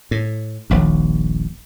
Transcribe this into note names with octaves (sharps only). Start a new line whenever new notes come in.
A2
D#1 A#1 D#2